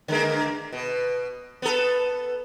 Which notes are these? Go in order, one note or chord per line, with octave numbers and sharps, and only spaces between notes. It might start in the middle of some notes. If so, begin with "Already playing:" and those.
D3 G#3 A#3
B2
B3 A4